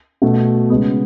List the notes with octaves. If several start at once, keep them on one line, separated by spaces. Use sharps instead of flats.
B2 A3
C#3 G#3 B3